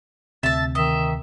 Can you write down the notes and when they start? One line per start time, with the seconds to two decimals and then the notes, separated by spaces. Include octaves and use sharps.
0.43 D2 C3 E5 A5 A6
0.75 D#3 D#5 E5